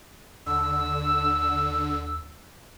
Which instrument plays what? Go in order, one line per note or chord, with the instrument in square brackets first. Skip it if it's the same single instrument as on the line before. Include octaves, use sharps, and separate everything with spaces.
[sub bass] D#2 [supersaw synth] D3 [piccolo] E6